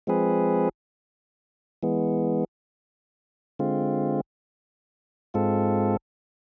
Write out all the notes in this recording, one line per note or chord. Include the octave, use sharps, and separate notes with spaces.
F3 G#3 C4 G#4 B4
E3 G#3 B3
D3 G#3 C4 F4
G#2 G#3 C4 F4 A4